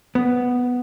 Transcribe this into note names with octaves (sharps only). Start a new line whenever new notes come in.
B3